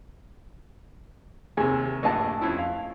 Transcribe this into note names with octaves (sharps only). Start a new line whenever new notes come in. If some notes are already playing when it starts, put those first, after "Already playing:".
D#2 C3 G#4
A#1 G2 A3 D#5 A5
F2 C#4 E4
F5